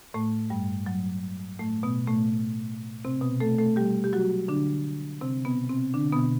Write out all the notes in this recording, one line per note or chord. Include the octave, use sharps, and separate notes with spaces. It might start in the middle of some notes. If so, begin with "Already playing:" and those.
A2 A3
G2 G3
F#3
A2 A3
B2 B3
A2 A3
C3 C4
B2 B3
A3 A4
A3 A4
G3 G4
G4
F#3 F#4
D3 D4
C3 C4
B2 B3
C3 C4
D3 D4
B2 B3